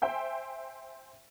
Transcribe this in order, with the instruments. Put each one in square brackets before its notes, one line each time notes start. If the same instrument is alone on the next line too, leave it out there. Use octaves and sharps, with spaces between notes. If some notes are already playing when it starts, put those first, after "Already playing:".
[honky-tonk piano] C5 E5 G5 G#5